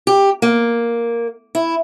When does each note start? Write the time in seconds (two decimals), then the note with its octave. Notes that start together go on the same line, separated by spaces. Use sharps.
0.07 G4
0.42 A#3
1.55 E4